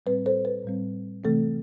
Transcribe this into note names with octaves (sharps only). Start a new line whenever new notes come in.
A2 G3 C4 B4
A4 C5
B4
A2 G3 C4
C3 E3 A3 C4 A4